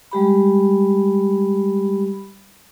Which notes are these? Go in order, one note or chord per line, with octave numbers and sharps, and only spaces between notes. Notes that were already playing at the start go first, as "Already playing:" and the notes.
G3 G#3 G4 B5